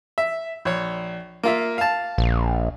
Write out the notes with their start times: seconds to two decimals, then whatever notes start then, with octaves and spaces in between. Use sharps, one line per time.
0.18 E5
0.65 A#1 C#5
1.43 A#3 F4 E5
1.78 F5 A5
2.18 A#1